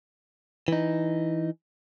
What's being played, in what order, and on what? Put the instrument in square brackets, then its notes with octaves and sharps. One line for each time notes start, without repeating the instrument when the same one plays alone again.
[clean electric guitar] E3 D#4